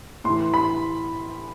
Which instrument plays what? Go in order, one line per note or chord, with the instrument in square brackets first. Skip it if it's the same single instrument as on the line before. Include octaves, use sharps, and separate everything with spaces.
[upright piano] A2 E3 C6
B5